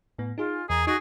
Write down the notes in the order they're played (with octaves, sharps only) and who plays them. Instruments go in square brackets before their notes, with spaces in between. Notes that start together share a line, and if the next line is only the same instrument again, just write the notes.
[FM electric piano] A2 B3
[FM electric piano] D#4 G#4 [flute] F4
[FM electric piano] E2 [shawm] G#4 [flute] A#5
[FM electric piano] D#4 C#6 [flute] F#4 [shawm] G#4